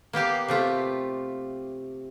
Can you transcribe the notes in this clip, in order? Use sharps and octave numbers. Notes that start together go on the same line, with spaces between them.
A#3 B3 G4 F5
C3 A3 F4